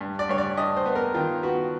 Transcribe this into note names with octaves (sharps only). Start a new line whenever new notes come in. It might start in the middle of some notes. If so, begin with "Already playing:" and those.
G2
D5
G2 C#5
D5
G2 D#5
C5
B3
A#4
D#3 F4
B3 F#4